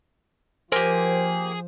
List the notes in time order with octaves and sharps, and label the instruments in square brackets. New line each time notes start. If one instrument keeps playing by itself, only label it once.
[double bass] F3 [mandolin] A#3 G4 [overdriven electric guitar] G#4 [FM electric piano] C5